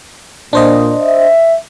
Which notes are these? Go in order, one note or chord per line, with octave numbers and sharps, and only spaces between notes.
A#2 D4 C5 D#5
E5